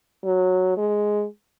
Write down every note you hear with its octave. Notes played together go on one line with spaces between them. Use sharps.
F#3
G#3